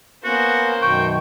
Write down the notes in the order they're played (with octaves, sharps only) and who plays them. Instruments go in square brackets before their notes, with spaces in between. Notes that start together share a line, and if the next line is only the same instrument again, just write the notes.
[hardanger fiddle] A#3 C5 [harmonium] B3 C#4 [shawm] F#4
[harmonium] F#2 B2 D#3 [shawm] G5 [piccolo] C#6